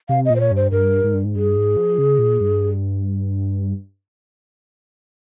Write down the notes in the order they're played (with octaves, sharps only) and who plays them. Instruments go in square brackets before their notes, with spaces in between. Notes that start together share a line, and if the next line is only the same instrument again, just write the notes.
[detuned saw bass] C3 [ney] F5
[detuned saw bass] A#2 [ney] D#5
[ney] C5
C#5
[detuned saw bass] G2
[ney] C5
[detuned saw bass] G2 [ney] A#4
[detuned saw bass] G#2
G2
G#2
[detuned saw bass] G2 [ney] G#4
[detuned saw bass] G#2
F3
C#3
A#2
G2